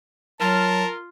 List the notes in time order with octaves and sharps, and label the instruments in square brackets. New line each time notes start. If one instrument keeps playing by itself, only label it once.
[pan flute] F#3 [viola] F4 [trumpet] A#4 [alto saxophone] A5